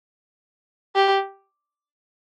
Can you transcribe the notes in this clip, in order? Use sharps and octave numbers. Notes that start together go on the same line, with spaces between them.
G4